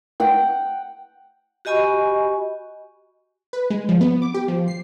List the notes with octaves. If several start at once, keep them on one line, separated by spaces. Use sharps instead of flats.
F#5 G5
F#4 G4 D#5 G#5 B5 C#6
B4
G#3
F3
B3
D6
G4
F3
C7